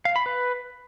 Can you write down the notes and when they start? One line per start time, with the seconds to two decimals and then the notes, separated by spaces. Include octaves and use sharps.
0.05 F5
0.16 B5
0.26 B4